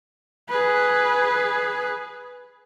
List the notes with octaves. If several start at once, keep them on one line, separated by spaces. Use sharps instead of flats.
G#4 B4